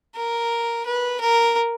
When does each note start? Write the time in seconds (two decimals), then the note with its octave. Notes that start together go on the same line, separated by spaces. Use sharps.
0.16 A#4
0.86 B4
1.21 A#4